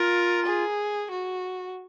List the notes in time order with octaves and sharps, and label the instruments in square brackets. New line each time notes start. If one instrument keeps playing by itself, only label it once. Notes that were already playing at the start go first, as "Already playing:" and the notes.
Already playing: [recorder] F4 [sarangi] A#4
[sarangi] G#4
F#4